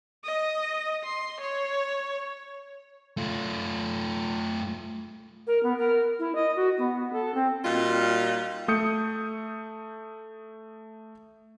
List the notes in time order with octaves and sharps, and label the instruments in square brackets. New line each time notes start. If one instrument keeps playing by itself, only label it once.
[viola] D#5
C6
C#5
[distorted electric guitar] A3 F4
[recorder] A#4
B3
A#4
E4
D#5
F#4
B3
A4
C4
[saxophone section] A#2 G3 D#4 F4 F#4 F5
[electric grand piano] A3 D#6 G6 C#7